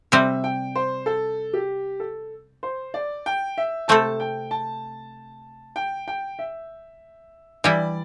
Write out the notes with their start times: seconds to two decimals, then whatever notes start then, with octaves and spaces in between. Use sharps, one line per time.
0.12 C3 G3 C4 E5
0.44 G5
0.76 C5
1.06 A4
1.53 G4
2.00 A4
2.63 C5
2.94 D5
3.26 G5
3.58 E5
3.88 C3 A3 C4 A4 A5
4.20 G5
4.51 A5
5.76 G5
6.08 G5
6.39 E5
7.64 E3 G3 E4 D5